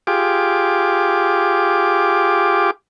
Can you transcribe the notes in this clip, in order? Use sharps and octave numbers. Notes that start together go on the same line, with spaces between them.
F4 G4 G#4 D6